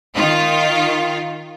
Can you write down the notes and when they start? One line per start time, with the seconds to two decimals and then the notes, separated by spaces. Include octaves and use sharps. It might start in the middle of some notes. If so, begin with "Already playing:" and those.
0.15 D#3 F4